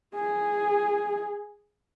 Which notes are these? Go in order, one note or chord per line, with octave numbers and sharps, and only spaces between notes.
G#4